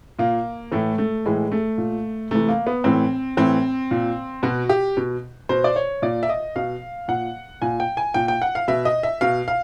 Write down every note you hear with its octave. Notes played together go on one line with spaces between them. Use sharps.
A#2 A#3
A2 E3 A3
A3
A2 E3 G#3
A3
A#2
C3 E3 A3
A#3
B3
A2 E3 C4
A2 E3 C4
A#2
B2 F#4
G4
B2
B2 C5
D5
C#5
A#2 D5
E5
D#5
B2 F5
A#2 F#5
A#2 G#5
G5
G#5
A#2 G5
G5
F#5
F5
B2 E5
D#5
E5
B2 F5
F5